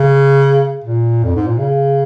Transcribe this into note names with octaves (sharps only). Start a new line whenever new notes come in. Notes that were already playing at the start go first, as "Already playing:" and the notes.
Already playing: C#3
A#2
F2
G#2
A#2
C#3